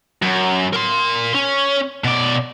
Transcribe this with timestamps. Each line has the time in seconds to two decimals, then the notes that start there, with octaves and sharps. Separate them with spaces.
0.22 F#2
0.73 A#4 C6
1.35 C#4
2.04 B2 D5